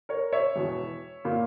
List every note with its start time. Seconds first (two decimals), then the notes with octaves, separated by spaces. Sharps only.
0.09 A#4 C#5
0.32 C#5 E5
0.56 E1 E2 B2
1.25 A#2 A#3